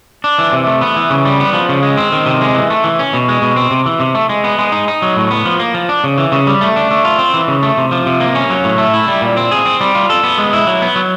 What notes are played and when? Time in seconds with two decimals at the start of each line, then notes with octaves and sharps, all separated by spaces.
0.24 D4
0.39 E3
0.53 C3
0.67 A3
0.81 B3
0.96 E3
1.10 C#3
1.25 G3
1.40 B3
1.53 F3
1.69 C#3
1.83 G#3
1.97 C4
2.12 D#3
2.26 C3
2.42 G#3
2.55 E3
2.70 A3
2.84 E3
2.99 C#4
3.14 B2
3.28 G#3
3.42 B2
3.56 C4
3.71 C3
3.86 E3
4.00 C3
4.15 A3
4.29 G#3
4.44 B3
4.58 G#3
4.72 D#4
4.88 D#4
5.02 F#3
5.16 A2
5.31 B3
5.45 F3
5.60 A#3
5.74 F3
5.89 D4
6.04 C#3
6.18 E3
6.32 C#3
6.47 G3
6.61 A3
6.76 D4
6.91 A3
7.05 F4
7.19 C4
7.34 E3
7.48 C#3
7.63 A3
7.77 C3
7.91 F3
8.06 C3
8.20 A#3
8.35 C#4
8.50 F#3
8.64 A2
8.78 A3
8.94 E4
9.08 G3
9.21 A#2
9.37 C4
9.51 G#4
9.65 C4
9.81 G3
9.95 F4
10.10 A4
10.24 B3
10.38 G#3
10.53 E4
10.67 F#3
10.82 B3
10.95 F#3